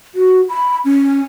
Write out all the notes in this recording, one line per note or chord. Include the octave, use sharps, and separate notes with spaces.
F#4
B5
C#4